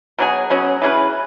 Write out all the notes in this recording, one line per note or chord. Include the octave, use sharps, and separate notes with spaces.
B2 F#3 C#4 G#4
B2 F#3 C#4 G#4
E3 C#4 G#4 B4